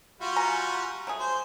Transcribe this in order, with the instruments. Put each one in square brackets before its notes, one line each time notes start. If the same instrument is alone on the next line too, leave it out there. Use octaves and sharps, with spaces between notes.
[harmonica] G3 F4 F#4
[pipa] G#5 A#5
F#3 A3 G#4
[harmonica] C5